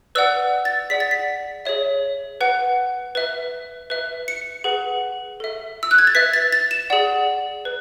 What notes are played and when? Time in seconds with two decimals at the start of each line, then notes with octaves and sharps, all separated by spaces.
0.15 B4 D5 F#5 E6
0.65 A6
0.90 G#4 D5 F#5 B6
1.00 A6
1.11 B6
1.65 G#4 C#5 E5
2.41 B4 F#5
3.15 B4 E5
3.90 B4 E5
4.28 C#7
4.64 G#4 B4 F#5
5.40 A4 E5
5.83 E6
5.91 F#6
5.98 G#6
6.07 A6
6.15 B4 E5 B6
6.33 A6
6.52 A6
6.71 E7
6.90 G#4 D5 F#5
7.65 B4